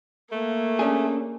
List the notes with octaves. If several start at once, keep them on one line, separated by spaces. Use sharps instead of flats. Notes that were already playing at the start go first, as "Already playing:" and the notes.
A3 A#3
C#4 D4 G#4